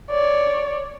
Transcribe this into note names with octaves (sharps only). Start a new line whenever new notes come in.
C#5 D5